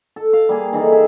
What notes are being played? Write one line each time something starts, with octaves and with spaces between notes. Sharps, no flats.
A4
F5
G3 A#3 G#4
E3 D#4 G#4 A4
G#4 E5